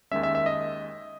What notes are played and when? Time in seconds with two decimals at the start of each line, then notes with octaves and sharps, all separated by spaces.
0.11 D#2 D#3 G#3 C#4 E5
0.23 E5
0.35 E5
0.46 D#5